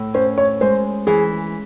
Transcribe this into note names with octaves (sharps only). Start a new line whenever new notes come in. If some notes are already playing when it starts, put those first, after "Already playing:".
Already playing: A2
C#4 C5
C#5
G#3 C5
E3 G#4